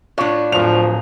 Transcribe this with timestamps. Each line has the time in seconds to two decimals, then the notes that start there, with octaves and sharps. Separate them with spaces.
0.18 A2 D4 F4 C#5
0.52 D1 F3 F7